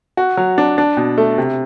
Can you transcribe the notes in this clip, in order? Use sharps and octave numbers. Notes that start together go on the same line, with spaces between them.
F#4
F#3
D4
D4
B2
A3
C3